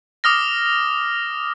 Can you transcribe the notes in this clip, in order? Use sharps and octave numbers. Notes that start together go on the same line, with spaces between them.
D6 D#6 F6 A#6